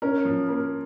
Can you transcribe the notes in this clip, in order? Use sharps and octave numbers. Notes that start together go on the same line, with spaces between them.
C#4 A#4
F3
A#3